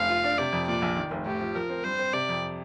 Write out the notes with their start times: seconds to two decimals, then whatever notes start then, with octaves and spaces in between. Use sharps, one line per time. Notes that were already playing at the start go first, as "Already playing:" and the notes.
Already playing: F1 F5
0.09 F4
0.24 D4
0.38 C3 D5
0.53 F2
0.67 A#2 D5
0.82 A#1
0.97 D#3
1.11 F1
1.26 A2 G4
1.41 F3
1.55 F3 A#4
1.70 C4
1.84 G2 C5
1.99 C4
2.13 C3 D5
2.29 F2